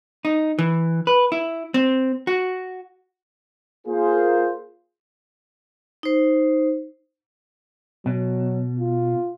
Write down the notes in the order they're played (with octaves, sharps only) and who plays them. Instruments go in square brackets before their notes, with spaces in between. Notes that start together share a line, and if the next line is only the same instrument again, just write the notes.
[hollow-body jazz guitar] D#4
E3
B4
E4
C4
F#4
[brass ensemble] A#3 F4 G#4 C5
[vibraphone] D#4 C5
[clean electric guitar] B2 [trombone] F#3
[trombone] F4